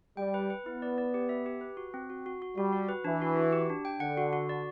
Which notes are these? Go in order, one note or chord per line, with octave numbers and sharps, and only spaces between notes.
G3 G5
B4
B4
B3 E4
D5
D5
G4
E5
G4
B4
F#4
C4
F#4
F#4
F#4
G3 F#4
F#4
B4
E3 D4
F#4
F#4
G4
D4
G5
D3 F#5
F#4
F#4
D5